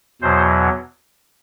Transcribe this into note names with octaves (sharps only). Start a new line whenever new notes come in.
E2 B2 F#3 C5